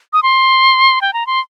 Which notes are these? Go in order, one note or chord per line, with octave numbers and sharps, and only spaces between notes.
D#6
C6
G5
A#5
C6